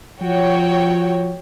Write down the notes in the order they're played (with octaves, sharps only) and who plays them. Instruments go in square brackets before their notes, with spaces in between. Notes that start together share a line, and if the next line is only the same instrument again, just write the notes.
[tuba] F3 [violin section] F#4 C#5 G5